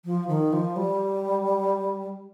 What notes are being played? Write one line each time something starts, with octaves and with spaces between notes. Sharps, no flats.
F3
D#3
F3
G3